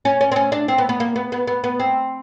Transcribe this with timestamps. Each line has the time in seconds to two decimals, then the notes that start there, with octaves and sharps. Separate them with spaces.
0.05 C#4
0.21 C#4
0.32 C4
0.36 C#4
0.52 D4
0.68 C4
0.78 B3
0.89 B3
1.00 A#3
1.16 B3
1.32 B3
1.47 B3
1.64 B3
1.80 C4